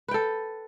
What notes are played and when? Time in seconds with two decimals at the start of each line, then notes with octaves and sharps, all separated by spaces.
0.08 B4
0.11 G5
0.14 A4